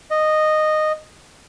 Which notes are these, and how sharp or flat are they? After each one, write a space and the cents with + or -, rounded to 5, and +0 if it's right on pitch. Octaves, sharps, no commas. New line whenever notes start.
D#5 -10